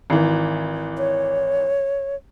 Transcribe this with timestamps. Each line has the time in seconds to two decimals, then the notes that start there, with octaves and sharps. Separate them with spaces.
0.10 G#1 E3
0.98 C#5